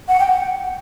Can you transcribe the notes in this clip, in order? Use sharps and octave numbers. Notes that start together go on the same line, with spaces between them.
F#5
G5
F#5